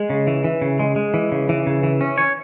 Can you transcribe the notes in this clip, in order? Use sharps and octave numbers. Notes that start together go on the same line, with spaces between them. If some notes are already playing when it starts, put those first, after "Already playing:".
Already playing: G#3
C#3
E3
E3
C#3
G#3
G#3
E3
C#3
E3
C#3
E3
C#4
C#5